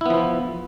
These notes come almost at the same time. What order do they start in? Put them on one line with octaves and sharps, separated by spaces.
E4 B3 F3